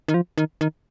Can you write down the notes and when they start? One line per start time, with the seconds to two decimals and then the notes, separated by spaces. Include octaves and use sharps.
0.08 D#3
0.14 F3
0.38 D#3
0.61 D#3